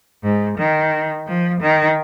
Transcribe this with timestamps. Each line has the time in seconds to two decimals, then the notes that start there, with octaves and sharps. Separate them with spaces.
0.23 G#2
0.58 D#3
1.26 F3
1.61 D#3